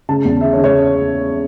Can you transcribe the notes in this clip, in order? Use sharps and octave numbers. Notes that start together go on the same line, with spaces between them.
C#3 A5
E2
C#3 E5
C#5
C#3
C#5